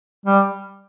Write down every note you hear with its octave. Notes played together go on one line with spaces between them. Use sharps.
G3